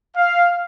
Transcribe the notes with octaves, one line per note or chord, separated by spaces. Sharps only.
F5